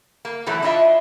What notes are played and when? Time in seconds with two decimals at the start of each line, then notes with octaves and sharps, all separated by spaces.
0.25 A#3
0.46 B2 E3 F#3 A3
0.62 D4 E4 F4 D#5 E5